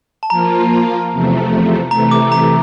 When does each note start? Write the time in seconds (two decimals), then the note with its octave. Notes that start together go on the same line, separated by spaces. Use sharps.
0.23 A5
0.30 F3 A#3 F4 A#5
1.11 E2 C3 F3 A3
1.91 C3 E3 A3 A#5
2.11 D6
2.32 A#5